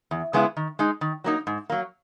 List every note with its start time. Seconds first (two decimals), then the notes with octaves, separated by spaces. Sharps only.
0.11 E2
0.33 C#3 G#3 B3 E4
0.57 D#3
0.79 G#3 D#4
1.01 D#3
1.24 F#3 A#3 D#4
1.47 G#2
1.70 F#3 A#3